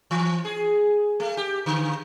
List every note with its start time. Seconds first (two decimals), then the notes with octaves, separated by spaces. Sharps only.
0.11 E3
0.45 G#4
1.20 A3
1.37 G4
1.66 D3